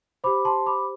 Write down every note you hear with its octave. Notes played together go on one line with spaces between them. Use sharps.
G4 C5 B5 D6
A5 C6
B5 D6